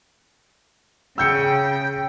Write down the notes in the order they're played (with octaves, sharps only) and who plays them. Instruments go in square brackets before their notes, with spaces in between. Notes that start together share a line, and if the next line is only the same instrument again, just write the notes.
[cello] C#3 [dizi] G5 [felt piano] E6 G6 C#7